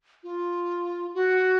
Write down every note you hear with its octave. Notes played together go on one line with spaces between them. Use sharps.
F4
F#4